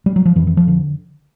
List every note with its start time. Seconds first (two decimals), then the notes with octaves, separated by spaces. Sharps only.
0.06 G3
0.16 F#3
0.25 F3
0.36 F2 E3
0.47 E3
0.57 F3
0.68 D3